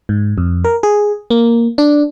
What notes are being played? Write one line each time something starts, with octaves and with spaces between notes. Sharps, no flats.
G#2
F2
A#4
G#4
A#3
D4